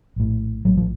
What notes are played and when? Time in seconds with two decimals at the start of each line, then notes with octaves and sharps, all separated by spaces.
0.16 A#1 A2
0.65 A#1 A2 F#3
0.77 F3